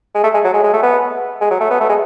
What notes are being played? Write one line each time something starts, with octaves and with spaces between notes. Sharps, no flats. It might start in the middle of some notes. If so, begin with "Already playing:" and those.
G#3
A3
G#3
F#3
G#3
G#3
A3
B3
G#3
F#3
A3
B3
A3
G#3